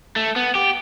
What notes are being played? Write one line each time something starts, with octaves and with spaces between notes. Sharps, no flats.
A3
B3
G4